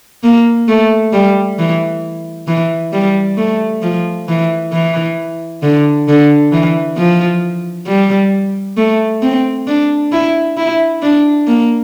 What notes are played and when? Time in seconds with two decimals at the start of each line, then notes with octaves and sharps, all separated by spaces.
0.23 A#3
0.68 A3
1.13 G3
1.59 E3
2.48 E3
2.93 G3
3.37 A3
3.82 F3
4.28 E3
4.73 E3
5.63 D3
6.08 D3
6.52 E3
6.98 F3
7.87 G3
8.77 A3
9.22 C4
9.67 D4
10.12 E4
10.57 E4
11.02 D4
11.47 A#3